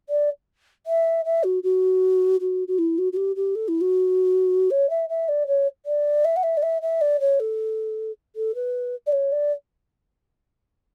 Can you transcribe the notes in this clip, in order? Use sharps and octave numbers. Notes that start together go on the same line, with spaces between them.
D5
E5
E5
F#4
F#4
F#4
F#4
E4
F#4
F#4
G4
G4
A4
E4
F#4
C#5
E5
E5
D5
C#5
D5
E5
F#5
E5
D5
E5
E5
D5
C#5
A4
A4
B4
D5
C#5
D5